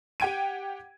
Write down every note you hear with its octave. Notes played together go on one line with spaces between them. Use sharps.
G4 F#5 G5 G#6 D7 D#7